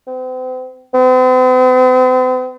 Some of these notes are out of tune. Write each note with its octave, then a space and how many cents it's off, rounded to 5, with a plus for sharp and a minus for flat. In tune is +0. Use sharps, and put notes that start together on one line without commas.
C4 -40
C4 -45